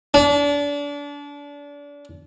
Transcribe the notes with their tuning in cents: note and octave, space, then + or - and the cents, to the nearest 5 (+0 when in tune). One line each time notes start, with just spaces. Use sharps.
D4 -30